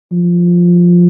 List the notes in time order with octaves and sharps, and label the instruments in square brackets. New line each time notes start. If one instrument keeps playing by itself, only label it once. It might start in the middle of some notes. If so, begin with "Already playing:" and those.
[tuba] F3